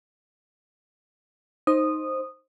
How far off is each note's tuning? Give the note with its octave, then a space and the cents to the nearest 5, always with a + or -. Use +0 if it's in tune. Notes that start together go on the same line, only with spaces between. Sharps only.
D#4 +0 C5 +10 D#6 -15